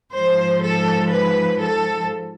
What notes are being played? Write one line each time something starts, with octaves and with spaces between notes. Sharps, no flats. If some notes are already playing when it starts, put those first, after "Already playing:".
G#2 F3 C5
A4
B4
A4